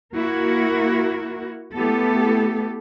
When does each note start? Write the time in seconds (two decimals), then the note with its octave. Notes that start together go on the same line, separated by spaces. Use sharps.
0.14 A#3 E4 F#4 A#4
1.74 A3 B3 E4 G4 A4